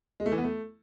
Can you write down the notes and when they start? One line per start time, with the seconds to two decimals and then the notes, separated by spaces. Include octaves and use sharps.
0.20 G#3
0.26 A3
0.32 E3
0.38 B3
0.44 A3